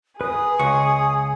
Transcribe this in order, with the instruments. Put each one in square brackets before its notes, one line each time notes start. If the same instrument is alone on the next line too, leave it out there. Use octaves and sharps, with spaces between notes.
[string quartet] G#4 [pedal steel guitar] B4 [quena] D#6
[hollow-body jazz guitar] C#2 [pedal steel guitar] C#6